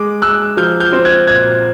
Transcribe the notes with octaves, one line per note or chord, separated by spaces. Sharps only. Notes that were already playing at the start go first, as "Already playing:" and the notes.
Already playing: G#3 D6
G#3 E6 F#6
F3 F6 G6
F6 G6
C4
F#6 G#6
A#2 F#6 G#6